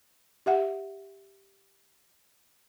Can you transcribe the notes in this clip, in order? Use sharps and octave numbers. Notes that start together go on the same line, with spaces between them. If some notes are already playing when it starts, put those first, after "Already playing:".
G4 E5 F#5